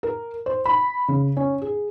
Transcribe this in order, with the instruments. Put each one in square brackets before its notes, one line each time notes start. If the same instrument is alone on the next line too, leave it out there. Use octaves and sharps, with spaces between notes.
[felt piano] A#4
C5
B5
C#3
C#4
G#4